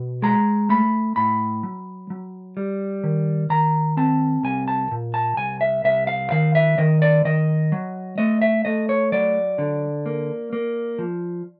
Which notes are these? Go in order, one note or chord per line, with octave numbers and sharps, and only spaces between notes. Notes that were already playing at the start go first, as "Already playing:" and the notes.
Already playing: B2
G#3 A#5
A3 B5
A2 B5
F#3
F#3
G3
D#3
D#3 A#5
C4 A5
C2 G#5
A5
A#2
A5
C2 G#5
E5
C2 E5
F5
D#3 F5
E5
D#3 D#5
D5
D#3 D#5
F#3
A3 D#5
E5
A3 D#5
C#5
F#3 D5
D3
A#3
A#3
F3